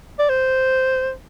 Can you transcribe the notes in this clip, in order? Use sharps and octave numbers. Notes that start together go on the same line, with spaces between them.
D5
C5